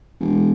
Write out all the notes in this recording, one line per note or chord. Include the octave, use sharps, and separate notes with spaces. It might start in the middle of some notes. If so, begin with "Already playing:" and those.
E1